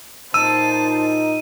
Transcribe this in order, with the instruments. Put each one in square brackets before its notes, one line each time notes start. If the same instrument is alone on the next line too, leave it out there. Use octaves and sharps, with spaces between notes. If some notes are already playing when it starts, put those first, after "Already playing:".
[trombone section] A#2 D#4 [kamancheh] C5 A5 [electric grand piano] E6 [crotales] D#7